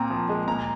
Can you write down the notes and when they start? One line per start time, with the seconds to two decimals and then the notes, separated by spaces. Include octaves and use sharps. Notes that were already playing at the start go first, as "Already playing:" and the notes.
Already playing: A#2 C4 A#5
0.10 F3
0.29 G#3
0.48 A#2 A#5